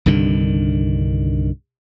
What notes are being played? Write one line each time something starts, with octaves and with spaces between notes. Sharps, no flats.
C2 G2 D3 D#3